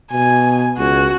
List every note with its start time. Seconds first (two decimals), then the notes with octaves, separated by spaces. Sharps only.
0.12 B2 G#5
0.78 C#2 F#4